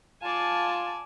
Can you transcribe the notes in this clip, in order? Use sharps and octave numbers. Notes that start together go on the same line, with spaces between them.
F4 D5 G#5 A5